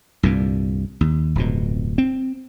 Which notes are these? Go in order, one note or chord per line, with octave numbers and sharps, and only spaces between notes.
C2 G2 A#2
D#2
D1 F2 B2
C4